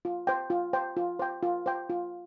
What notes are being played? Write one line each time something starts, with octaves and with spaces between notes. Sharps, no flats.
F4
C5 G5
F4
C5 G5
F4
C5 G5
F4
C5 G5
F4